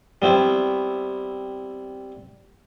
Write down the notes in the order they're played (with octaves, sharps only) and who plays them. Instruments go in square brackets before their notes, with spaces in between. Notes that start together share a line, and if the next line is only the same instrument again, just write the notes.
[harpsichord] G3 B3 C4 E4